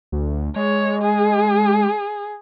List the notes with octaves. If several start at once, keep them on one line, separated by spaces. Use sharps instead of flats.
D2
G#3 C#5
G#4